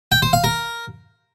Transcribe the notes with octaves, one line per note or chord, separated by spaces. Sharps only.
G5
C5
F5
A#4